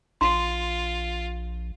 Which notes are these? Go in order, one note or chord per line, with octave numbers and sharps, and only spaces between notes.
A#1 F4 C6